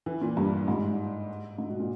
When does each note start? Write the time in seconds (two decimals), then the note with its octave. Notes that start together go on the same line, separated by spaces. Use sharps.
0.06 E3
0.21 A#2
0.37 G2
0.68 G#2
1.59 G#2
1.70 B2
1.80 A#2